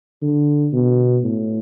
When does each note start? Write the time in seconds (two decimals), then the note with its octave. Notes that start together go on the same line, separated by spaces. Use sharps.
0.22 D3
0.73 B2
1.24 A2